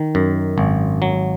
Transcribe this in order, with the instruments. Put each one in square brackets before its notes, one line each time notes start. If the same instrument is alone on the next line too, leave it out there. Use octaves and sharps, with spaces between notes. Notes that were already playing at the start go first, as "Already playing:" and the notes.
Already playing: [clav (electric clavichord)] D#3
F#2
G#1
F#3